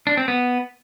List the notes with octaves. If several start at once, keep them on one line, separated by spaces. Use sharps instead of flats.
D4
C4
B3